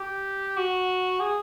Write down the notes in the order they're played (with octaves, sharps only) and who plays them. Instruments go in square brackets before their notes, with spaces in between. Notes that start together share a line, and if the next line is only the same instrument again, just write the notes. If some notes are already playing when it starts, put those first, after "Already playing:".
Already playing: [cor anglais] G4
F#4
G#4